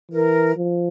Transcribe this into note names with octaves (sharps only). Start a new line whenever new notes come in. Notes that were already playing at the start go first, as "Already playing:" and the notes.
E3 A#4
F3